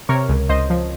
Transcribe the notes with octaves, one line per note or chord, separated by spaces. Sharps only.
C3 A#4 C#5
C#2
C#2 C5 D#5
F3